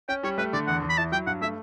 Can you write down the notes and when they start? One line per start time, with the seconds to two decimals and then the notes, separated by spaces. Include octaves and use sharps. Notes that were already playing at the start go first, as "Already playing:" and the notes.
0.09 C#4 G5
0.23 G3 C#5
0.38 A3 B4
0.53 D3 D5
0.67 E2 F#5
0.82 E2
0.89 B5
0.98 E4 A5
1.12 F#3 G5
1.27 G2 F#5
1.42 A3 E5